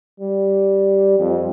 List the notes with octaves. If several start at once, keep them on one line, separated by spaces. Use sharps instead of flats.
G3
F2